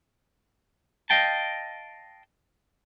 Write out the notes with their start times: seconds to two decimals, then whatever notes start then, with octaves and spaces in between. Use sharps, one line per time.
1.10 D#5 F5 G5 A5